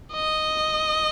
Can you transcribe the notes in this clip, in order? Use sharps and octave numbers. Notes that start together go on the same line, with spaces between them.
D#5